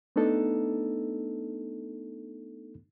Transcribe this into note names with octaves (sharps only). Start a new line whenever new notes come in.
A3 B3 D4 D#4 A4